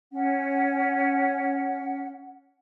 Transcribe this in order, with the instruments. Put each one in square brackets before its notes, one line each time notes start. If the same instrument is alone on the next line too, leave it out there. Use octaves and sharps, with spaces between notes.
[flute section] C#4 F#5